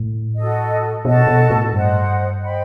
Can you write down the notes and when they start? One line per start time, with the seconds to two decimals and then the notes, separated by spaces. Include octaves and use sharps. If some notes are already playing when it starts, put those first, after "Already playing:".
Already playing: A2
0.37 F#4 A4 D#5
1.05 B2 F#4 A4 D#5 A5
1.27 B2
1.50 A2
1.73 G2 C5 D#5 F#5
2.40 C5 D#5 G5 B5